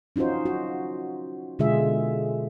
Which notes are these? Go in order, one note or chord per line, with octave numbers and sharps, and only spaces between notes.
C#4 D#4 F4 F#4 C5
F#4
B2 D3 G#3 F4 G#4 E5